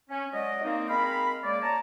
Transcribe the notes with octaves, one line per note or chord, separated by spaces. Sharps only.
C#4
F#3 G#3 D5 D#5
A#3 C4 D#4
G#3 C4 A#4 F5 A#5 B5
C#3 G#3 A#3 D5
C#5 A5 A#5